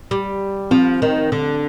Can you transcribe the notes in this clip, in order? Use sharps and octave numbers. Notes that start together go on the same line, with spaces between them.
G3
F3 C4
D#3
D3